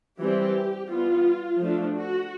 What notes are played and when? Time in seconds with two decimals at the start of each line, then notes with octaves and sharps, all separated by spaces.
0.21 E3 G3 C4 E4 G4
0.92 E3 G3 B3 F4
1.61 F3 A3 D4 F4
1.97 F#4